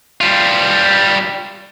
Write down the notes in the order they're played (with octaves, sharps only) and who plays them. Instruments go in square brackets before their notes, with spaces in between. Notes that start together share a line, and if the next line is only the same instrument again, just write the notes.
[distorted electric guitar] G3 F4